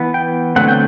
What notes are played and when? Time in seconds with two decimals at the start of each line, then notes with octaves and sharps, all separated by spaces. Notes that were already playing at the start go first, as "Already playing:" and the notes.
Already playing: E3 B3
0.14 G5
0.56 D3 F#3 A3 C4 F#5
0.68 G5